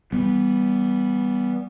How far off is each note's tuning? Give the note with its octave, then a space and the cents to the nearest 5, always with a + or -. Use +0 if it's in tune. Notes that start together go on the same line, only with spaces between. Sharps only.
E3 -15 G3 +0 B3 +0